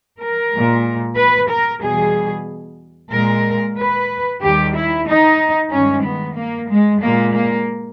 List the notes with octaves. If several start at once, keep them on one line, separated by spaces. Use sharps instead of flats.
A#4
G#3
A#2
B4
A#4
E2 B2 G3 G#4
A#2 G#3 A#4
B4
D#2 D#3 G3 G4
E4
D#4
G2 D#3 G#3 C#4
B3
A#3
G#3
A#2 G#3 A#3
A#3